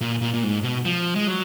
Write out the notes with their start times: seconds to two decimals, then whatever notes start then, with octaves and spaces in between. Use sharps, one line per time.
0.01 A#2
0.22 A#2
0.34 A#2
0.43 G#2
0.63 B2
0.85 F3
1.16 G#3
1.27 F#3